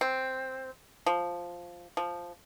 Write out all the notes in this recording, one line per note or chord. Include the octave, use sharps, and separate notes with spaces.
C4
F3
F3